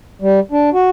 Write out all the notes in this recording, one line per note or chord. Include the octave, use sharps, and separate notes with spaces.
G3
D4
F#4